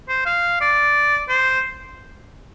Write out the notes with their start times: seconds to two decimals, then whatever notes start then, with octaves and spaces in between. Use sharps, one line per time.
0.09 C5
0.26 F5
0.61 D5
1.29 C5